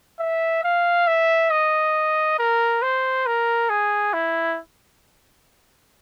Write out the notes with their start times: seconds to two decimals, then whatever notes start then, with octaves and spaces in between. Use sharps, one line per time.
0.20 E5
0.64 F5
1.07 E5
1.51 D#5
2.39 A#4
2.82 C5
3.26 A#4
3.70 G#4
4.14 E4